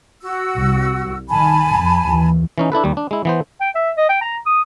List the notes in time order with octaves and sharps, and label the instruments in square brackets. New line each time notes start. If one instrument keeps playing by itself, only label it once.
[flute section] F#4 E6
[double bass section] C2
[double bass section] D#3 [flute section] G#5 A5 B5
[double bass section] F2
D#2 E3
[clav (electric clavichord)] E3 C#4 D#4
D4 E4 A4 B4
D#2 G3
D4
G#3 E4
E3 B3 C5
[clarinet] G5
E5
D#5
G5
A#5
D#6